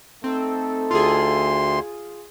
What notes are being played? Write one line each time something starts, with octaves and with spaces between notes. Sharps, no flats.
A3 C4 D#4 A4
D2 F4 G#4 C6